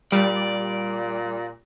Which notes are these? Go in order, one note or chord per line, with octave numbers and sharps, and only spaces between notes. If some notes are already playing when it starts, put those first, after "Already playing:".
A#2 G3 D5